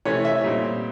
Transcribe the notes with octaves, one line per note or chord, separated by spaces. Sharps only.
C3 E3 A3 C#4 C#5
E5
A#2 G3 C4 D#4